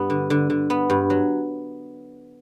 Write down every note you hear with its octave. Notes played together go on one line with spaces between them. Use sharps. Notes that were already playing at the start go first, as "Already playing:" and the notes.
Already playing: G2 G3 B3
D3
D3
D3
B3
G2
F#3